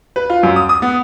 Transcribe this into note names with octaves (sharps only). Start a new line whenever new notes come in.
B4
F4
F#2
D#6
D#6
B3